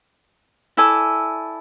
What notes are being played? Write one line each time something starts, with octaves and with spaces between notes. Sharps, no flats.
E4 A4 D5 G#5